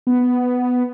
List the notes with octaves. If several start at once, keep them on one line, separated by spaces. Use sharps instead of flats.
B3